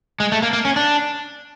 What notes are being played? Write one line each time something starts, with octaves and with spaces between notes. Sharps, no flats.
G#3
A3
A#3
A#3
C#4
D4